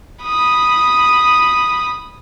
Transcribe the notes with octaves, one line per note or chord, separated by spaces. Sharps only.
B5 D#6